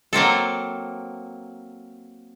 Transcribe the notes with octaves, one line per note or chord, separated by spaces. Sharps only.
F#3 A#3 C4 A4